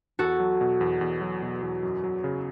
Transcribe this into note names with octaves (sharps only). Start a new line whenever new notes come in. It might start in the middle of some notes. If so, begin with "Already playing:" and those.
E2 F#4 A4
F#3
B2
E2
E2
F#3
B2
E2
F#2
F#3
C#3